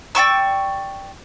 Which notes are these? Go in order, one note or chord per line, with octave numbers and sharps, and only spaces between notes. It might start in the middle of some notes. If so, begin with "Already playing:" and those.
D5 G5 C#6 E6